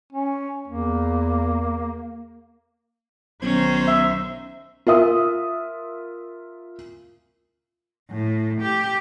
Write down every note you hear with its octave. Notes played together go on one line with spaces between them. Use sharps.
C#4
E2 A#3
B1 D#3 C#4 C5
E5
F4 A#4 E5 D#6
A2
G4